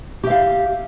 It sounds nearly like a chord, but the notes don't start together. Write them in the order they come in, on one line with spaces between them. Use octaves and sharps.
G4 E5 F5